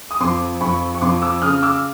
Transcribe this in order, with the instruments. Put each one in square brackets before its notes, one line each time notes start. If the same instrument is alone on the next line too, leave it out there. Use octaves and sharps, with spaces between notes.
[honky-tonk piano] D#6
F2 C6 D6
F2 B5 C#6
C#6
F2 C6 D6
D6 E6
C#3 D#6 F6
D6 E6